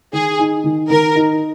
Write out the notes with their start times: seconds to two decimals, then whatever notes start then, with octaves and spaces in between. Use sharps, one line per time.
0.13 D#3 G#4
0.39 D#4
0.64 D#3
0.90 D#3 A#4
1.16 D#4